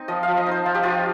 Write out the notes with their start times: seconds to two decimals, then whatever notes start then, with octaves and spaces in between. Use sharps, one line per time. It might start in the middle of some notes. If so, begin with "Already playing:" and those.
Already playing: C4 D#4
0.08 F3 D#5
0.23 F5
0.28 F3
0.37 D#5
0.46 D#4 C5
0.66 F3 F4
0.75 G4
0.83 F3 F4